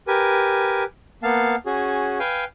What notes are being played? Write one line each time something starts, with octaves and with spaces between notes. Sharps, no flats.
G4 A#4 B4 G#5
A#3 B3 F5 A5
C#4 F#4 G#4
B4 F5 G5 G#5